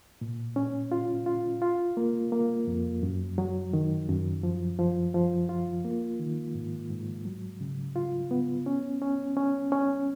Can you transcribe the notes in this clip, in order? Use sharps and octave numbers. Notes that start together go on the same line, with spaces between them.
A#2
C#4
F4
F4
F4
A#3
A#3
F2
F#2
F#3
D#3
F#2
F3
F3
F3
F4
A#3
D#3
G#2
G#2
F#3
C#3
F4
B3
C#4
C#4
C#4
C#4